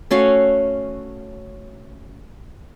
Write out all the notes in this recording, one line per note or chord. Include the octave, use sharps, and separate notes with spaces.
A3 C#4 F#4 F5